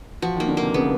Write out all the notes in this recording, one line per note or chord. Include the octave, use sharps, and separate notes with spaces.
F3 F#4
D#3 A#3
D3
C3 A#3
C#3 B3